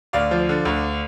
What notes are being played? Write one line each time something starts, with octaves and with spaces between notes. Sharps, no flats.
D2 D5 F5
F3
D3
D2